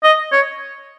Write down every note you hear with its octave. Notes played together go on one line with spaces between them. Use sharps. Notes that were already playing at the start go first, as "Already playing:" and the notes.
D#5
C#5